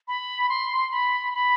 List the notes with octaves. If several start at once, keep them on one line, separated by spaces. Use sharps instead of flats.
B5
C6
B5
B5